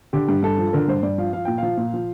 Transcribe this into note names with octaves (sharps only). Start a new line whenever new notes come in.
D3 G4
G2
G2 A4
F3
D3 A#4
G2 C5
G2 D5
F3 F5
F3 F5
A#2 G5
F3 F5
A#2
F3